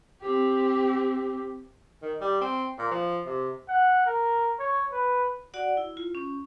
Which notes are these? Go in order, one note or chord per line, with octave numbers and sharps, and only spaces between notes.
C4 G4
D#3
G3
C4
A#2
F3
C3
F#5
A#4
C#5
B4
F#4 D5 F#5
E4
F4
C#4